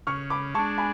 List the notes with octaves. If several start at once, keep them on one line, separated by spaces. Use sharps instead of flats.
C#3 C#6 F6
B5 D6
G#3 D4 A5 C#6
G#5 B5